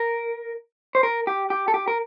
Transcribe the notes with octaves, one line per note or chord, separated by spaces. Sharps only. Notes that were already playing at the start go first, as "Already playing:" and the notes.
Already playing: A#4
C5
A#4
G4
G4
A4
G4
A#4